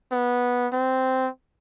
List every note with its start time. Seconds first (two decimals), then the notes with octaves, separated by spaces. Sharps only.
0.12 B3
0.73 C4